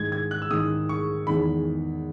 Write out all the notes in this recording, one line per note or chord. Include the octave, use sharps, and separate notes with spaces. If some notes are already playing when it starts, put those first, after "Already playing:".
Already playing: G#2 D#3 G#3 G#6
G#6
F#6
E6
G#2 D#3 G#3 D#6
C#6
E2 D#3 G#3 B5